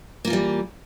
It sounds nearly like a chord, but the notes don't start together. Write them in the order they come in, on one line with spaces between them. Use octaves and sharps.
A#3 F4 E3 G3